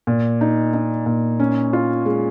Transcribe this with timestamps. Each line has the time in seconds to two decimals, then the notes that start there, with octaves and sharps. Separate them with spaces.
0.07 A#2
0.41 D#4
0.74 D#4
1.06 A#2
1.39 C#4
1.73 F4
2.06 G#3